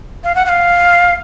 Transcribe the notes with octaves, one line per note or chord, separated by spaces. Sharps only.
F5
F#5
F#5
F5